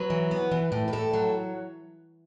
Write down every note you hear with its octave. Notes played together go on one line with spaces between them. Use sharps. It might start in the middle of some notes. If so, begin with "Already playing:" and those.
Already playing: F#3 B4
E3
B3
E3
A2
B4
A2 A4
F#3